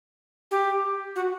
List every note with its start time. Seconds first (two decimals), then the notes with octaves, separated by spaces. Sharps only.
0.51 G4
1.16 F#4